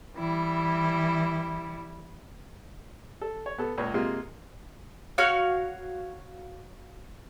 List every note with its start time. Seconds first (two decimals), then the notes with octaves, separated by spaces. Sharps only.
0.18 E3 G3 E4
3.21 A4
3.46 C#5
3.58 B3 A4
3.78 C#2 A#2 C#5
3.94 C3 G#3 A#3 F4
5.18 F#4 C#5 F5 F6